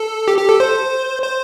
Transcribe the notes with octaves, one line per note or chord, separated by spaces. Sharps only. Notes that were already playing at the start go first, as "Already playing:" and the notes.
Already playing: A4
G4
G4
A4
C5
C5